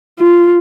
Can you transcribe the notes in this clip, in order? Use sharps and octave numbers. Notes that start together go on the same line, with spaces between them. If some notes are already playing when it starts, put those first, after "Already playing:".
F4